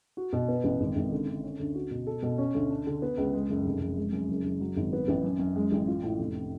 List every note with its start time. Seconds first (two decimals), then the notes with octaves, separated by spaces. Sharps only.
0.17 F#4
0.33 B2
0.49 B3
0.64 A1
0.80 G#1
0.96 G#1
1.12 D3
1.27 D3
1.43 C#4
1.59 D2
1.75 F#4
1.91 B2
2.07 A4
2.23 B2
2.38 C#4
2.55 D2
2.70 D4
2.87 D3
3.02 B3
3.17 C#2
3.34 G#3
3.50 F#1
3.65 F1
3.81 F1
3.97 G#3
4.13 F#2
4.29 F#1
4.45 F#1
4.61 F#3
4.76 G#1
4.93 B3
5.08 A1
5.24 F#2
5.39 F#2
5.56 G#3
5.72 A1
5.88 F4
6.03 A2
6.19 F1